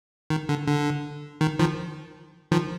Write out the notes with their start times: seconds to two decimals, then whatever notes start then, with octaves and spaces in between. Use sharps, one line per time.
0.30 D#3
0.49 D3
0.67 D3
1.41 D#3
1.59 D#3 F3
2.51 D#3 F3